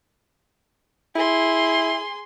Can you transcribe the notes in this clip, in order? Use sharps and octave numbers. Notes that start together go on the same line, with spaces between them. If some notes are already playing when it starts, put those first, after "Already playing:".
E4 G#4 C6